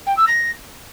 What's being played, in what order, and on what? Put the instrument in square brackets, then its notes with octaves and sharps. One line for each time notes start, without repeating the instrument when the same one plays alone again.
[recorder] G5
E6
A#6